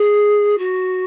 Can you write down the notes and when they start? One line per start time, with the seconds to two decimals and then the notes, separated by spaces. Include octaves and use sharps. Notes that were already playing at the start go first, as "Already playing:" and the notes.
Already playing: G#4
0.58 F#4